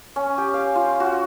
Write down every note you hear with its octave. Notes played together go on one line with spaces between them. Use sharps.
C#4
G4
F5
F4
F#4